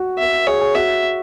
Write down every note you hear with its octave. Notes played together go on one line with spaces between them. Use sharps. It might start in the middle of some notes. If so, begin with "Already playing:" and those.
Already playing: F#4
E5
G#4 C#5
G#4
F#4 E5